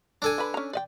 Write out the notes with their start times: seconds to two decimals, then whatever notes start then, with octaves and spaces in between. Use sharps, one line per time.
0.22 D4 A4 G#5
0.38 D3 B4 B5
0.54 C#4 A#5
0.73 D5 D#5 G5